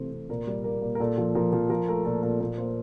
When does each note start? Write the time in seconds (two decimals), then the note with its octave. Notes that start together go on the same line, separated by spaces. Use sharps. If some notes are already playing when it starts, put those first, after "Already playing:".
Already playing: C3 E3 A3 C5
0.12 C3
0.29 A#2 A#4
0.47 G3
0.64 A#3 A#4
0.82 A#2
0.95 A#4
1.00 A#2 A4
1.17 F3
1.35 F3 A#4
1.53 F3
1.70 F3 A#4
1.88 A3 A#4
2.05 A#2 A4
2.23 A#2 A#4
2.40 A#2 A#4
2.58 A#3 C5